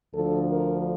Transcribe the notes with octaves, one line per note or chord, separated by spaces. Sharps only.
D2 D3 F3 A4
A#4